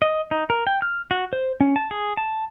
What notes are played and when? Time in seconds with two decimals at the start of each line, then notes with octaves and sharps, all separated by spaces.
0.02 D#5
0.31 D#4
0.50 A#4
0.67 G5
0.82 F6
1.11 F#4
1.33 C5
1.61 C#4
1.76 A5
1.91 G#4
2.17 A5